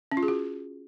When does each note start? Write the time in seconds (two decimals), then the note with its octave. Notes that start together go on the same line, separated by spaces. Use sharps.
0.12 C#4
0.17 F4
0.23 G#4
0.28 F#4